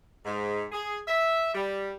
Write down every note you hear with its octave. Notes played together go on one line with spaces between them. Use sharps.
G#2
G#4
E5
G3